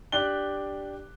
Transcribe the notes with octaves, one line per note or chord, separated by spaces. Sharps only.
D4 G4 F#6 G7